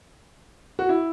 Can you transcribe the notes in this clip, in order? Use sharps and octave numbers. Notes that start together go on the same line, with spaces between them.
F#4
E4